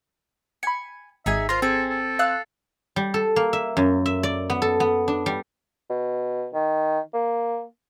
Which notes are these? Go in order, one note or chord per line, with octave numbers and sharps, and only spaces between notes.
G#5 B5 C#7
G#1 D#4 G#4 E5 G#5
F4 A#4 C5 C6 A#6
C4 G#4 A4
A4
F5 E6 F#6
G3
A4
A#3
E5
F#2
E5
D5
B3
A4
B3
D4
G3
B2
D#3
A#3